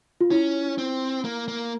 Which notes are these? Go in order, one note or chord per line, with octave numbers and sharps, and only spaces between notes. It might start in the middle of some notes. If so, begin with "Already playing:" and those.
F4
C#4 E4
C4
A#3
A#3